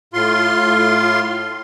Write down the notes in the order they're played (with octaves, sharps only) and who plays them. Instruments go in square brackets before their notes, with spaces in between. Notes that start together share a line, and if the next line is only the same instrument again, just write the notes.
[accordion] A2 F4 C6